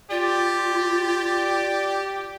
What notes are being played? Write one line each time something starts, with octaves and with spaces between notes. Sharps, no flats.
F4 G4 D5